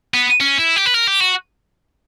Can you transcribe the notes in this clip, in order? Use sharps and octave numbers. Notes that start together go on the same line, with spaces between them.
B3
C#4
E4
G4
B4
A#4
G4
F#4